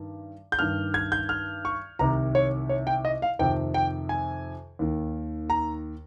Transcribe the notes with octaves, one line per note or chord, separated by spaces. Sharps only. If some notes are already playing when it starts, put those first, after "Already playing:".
Already playing: G2 D#3
G6
G2 D#3 F6
G#6
G6
F6
C#6
C2 C3 D#3 A#5
C#5
C#5
G5
D#5
F5
F2 C3 D#3 G5
G5
G#5
D#2 D#3
A#5